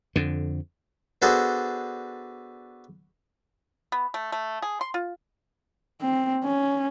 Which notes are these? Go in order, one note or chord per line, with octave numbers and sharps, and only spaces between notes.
F2 D3
B3 D4 F#4 G#4 A4 C5
B3
A3
A3
G#4
C6
F4
C4
C#4